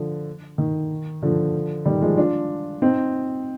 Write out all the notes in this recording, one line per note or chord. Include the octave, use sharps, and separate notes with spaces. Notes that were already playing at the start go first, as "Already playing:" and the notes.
Already playing: D3 F3
D#3
D3 F3
D#3 G3
F3 G#3
D4 F4
C4 D#4